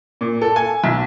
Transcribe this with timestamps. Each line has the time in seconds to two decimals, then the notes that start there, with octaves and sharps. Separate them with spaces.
0.21 A#2
0.42 A4
0.56 G#5
0.84 B1